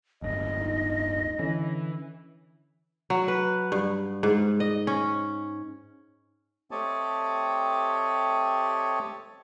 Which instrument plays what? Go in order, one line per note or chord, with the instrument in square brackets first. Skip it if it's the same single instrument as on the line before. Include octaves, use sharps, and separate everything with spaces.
[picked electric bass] D1 G1 [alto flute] D#5
[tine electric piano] D#4
[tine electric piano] D3 C#4 [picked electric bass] E3
[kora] F#3
B4
G2
G#2
D#5
C#4
[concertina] A3 C4 G4 C#5 D#5 A5